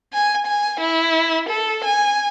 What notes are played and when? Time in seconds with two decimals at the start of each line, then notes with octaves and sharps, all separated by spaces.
0.13 G#5
0.47 G#5
0.80 E4
1.49 A4
1.85 G#5